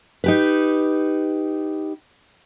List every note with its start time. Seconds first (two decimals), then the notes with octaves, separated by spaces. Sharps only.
0.24 D#4 G4 B4